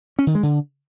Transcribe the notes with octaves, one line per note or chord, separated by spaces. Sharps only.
C#4
D#3
G#3
D3